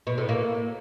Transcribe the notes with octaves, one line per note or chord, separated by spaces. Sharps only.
B2
A2
A#3